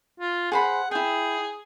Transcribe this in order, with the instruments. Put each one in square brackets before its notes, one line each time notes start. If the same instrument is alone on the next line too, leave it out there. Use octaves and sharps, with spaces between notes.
[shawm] F4
[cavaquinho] G#4 C5 B5 [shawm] F#5
[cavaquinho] E4 G5 [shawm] G#4